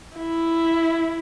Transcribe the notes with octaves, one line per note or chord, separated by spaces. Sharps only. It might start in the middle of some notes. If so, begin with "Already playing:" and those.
E4